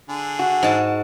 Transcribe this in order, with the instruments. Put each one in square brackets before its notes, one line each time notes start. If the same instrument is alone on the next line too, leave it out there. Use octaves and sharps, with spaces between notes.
[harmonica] D3 G#4
[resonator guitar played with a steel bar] F#4
[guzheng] G#2 A5